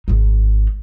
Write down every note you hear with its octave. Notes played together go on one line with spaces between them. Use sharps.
G#1 D#4